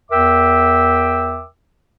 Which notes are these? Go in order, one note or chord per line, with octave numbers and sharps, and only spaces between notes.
E2 A#4 E5 G5 D6 E6